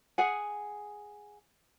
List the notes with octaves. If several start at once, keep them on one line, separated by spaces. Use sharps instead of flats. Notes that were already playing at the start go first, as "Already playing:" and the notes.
G#4 F#5 G#5